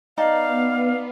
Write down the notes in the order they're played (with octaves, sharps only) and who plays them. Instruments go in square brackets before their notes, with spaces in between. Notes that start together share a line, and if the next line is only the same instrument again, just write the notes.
[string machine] B3 [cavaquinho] D#4 D5 A5 [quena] F5